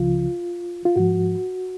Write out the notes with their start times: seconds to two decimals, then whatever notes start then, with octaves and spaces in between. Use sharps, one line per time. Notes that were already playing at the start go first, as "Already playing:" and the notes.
Already playing: C#2 C#3 F3 F4
0.85 F4
0.96 G#2 F3 F#4